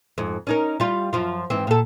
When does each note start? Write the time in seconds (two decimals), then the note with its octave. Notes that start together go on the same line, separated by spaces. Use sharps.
0.18 F2 G#2
0.47 C#4 D#4 A#4
0.80 G3 F4
1.13 F#2 F3 F4
1.50 G#2 E3 C4
1.67 A#2 A4